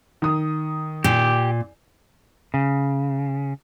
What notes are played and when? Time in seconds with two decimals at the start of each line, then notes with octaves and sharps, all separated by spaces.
0.22 D#3 D#6
1.04 A#2 G4
2.54 C#3